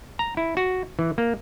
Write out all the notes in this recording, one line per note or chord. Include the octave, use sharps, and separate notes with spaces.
A#5
E4
F#4
E3
A#3